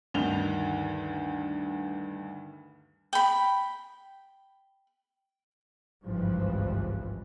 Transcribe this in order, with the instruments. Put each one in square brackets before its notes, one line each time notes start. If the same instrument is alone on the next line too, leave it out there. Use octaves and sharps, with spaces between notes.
[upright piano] D2 G2 D#3 F7 G7
[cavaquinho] G5 B5
[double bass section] G#1 C#2 G2 E3 F3